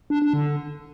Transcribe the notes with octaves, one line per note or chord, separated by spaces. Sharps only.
D4
D4
D3